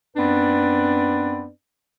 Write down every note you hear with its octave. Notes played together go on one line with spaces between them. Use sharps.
F#2 B3 C4 D4 B4 D5